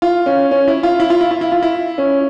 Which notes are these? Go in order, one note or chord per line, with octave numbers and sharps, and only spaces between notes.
F4
C#4
C#4
E4
F4
E4
F4
E4
F4
E4
F4
E4
C#4